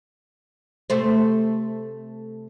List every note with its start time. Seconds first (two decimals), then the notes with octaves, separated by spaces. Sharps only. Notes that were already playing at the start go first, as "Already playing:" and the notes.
0.90 C3 A3 C5